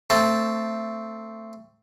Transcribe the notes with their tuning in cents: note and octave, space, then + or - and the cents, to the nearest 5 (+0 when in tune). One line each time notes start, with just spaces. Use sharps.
A3 +25 C4 +0 A5 +0